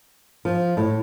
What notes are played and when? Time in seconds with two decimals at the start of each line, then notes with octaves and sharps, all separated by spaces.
0.45 F3
0.77 A2